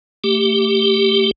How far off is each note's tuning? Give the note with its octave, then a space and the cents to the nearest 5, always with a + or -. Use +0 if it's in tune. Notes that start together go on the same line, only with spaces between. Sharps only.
A3 +30 G4 +0